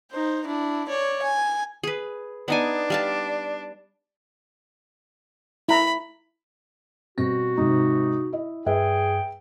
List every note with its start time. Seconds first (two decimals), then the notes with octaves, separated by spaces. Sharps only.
0.12 D#4 C5
0.45 D4 E4
0.89 C#5 D5
1.23 G#5
1.83 G#4 B4
2.48 B3 D4 D#4 G#5
2.90 G3 F5 A5
5.69 E4 A#5 B5
7.18 B2 G3 C4 F#4 A#6
7.57 G#2 C3 D#4
8.33 E4 D#5
8.66 G2 G#4 B4 E5 G5